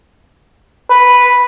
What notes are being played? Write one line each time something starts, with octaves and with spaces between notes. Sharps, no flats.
B4